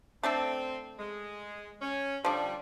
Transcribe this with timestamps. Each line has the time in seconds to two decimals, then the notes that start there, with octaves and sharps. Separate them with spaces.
0.23 A3 C4 D4 A4
0.99 G#3
1.82 C#4
2.25 D3 F3 G3 D4